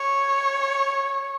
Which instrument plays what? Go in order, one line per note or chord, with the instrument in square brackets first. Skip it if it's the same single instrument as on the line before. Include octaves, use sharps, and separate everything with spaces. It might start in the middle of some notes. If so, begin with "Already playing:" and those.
Already playing: [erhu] C#5